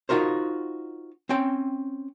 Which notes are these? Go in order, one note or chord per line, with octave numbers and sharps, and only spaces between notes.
D#4 F4 F#4 A#4 C5
C4 C#4 G5